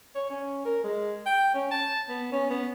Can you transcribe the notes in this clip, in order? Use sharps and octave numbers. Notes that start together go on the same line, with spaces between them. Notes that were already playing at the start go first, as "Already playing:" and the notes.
C#5
C#4
A#4
G#3
G5
C#4
A5
B3
C#4
B3